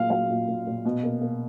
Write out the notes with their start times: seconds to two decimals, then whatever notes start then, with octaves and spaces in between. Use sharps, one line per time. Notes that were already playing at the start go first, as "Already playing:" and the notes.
Already playing: A#2 F#3 A#3 F5
0.10 F#3 F5
0.30 A#2
0.48 A#2
0.67 A#2
0.85 B2
1.03 A#3
1.21 A#3